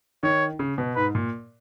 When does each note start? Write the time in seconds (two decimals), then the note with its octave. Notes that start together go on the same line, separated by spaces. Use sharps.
0.23 D#3 C#5
0.59 C#3
0.78 B2
0.96 G#2 B4
1.15 A#2